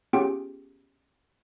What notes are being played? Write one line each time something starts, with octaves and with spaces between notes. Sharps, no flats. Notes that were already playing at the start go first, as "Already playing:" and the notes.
B3 C#4 F4 G4 G#4 G5